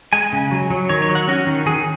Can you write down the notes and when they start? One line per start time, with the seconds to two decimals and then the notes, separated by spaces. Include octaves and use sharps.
0.13 G#3 G#5
0.33 C#3
0.51 F#3
0.70 F#3
0.89 D#3 C#5
1.02 C#5
1.09 F#3
1.15 F#5
1.28 C#4 F#4
1.47 D#3
1.66 D#3 G#4